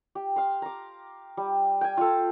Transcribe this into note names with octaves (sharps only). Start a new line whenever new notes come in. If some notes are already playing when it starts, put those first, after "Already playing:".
G4
F5 C6
A#5 D6
G3
G5 G#5
F4 A4